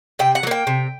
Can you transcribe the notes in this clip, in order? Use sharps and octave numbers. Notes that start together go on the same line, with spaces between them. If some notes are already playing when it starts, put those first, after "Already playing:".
C3 G5
F#5
F#3
A#3 G5
C3